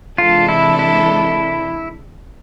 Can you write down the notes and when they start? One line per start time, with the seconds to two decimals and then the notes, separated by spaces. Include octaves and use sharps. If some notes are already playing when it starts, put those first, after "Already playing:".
0.18 C3 E3 G#3 D4 F4 A4
0.49 E4
0.79 E4